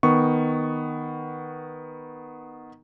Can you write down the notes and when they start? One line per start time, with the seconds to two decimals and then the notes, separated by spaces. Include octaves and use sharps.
0.03 D#3 B3 C#6